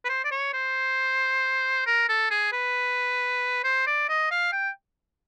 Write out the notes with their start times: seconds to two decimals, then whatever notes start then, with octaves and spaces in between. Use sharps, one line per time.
0.05 B4
0.09 C5
0.25 D5
0.32 C#5
0.54 C5
1.87 A#4
2.09 A4
2.31 G#4
2.53 B4
3.64 C5
3.87 D5
4.09 D#5
4.31 F5
4.53 G5